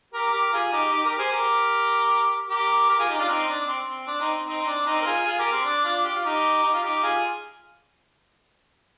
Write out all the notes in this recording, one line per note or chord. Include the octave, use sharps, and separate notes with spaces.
G4 A#4
G4 A#4
F4 G#4
D#4 G4
D#4 G4
G4 A#4
G#4 C5
G4 A#4
G4 A#4
G4 A#4
F4 G#4
D#4 G4
D4 F4
C4 D#4
D4
C4
C4
D4
C4 D#4
C4 D#4
C4
D4
C4 D#4
A#4
F4 G#4
F4 G#4
G4 A#4
C4
D4
D4 F4
G4
F4
D#4 G4
D#4
F4
D#4 G4
F4 G#4